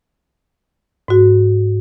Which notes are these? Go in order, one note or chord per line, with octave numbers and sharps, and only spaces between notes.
G#2 F#4